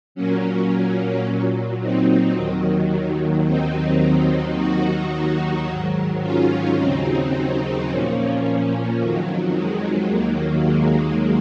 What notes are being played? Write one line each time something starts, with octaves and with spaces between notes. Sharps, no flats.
A#2 F#3 A#3 C#4
A#2 F#3
C4 D#4
D#2 D#3 F#3
D#2 D#3 F#3 C4 D#4
D#2 D#3 F#3 D#4 F#4
G#2 D#3 F#3
C#4 F4
D#2 C#3 F#3 C4 D#4
A#2 F3 A#3 C#4
A#3
F2 D#3 F#3
G#3
D#2 D#3 F#3 A#3
G#3